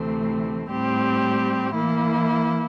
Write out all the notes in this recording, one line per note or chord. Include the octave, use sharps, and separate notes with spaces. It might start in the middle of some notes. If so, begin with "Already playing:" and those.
Already playing: D2 C3 E3 A3 C4
A2 G3 C4 G4
E3 A#3 E4